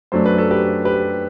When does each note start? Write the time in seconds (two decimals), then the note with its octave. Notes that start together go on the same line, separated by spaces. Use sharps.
0.12 F#2 F#3 A3 D4 C5
0.26 B4
0.38 A4
0.51 G4 B4
0.85 G4 B4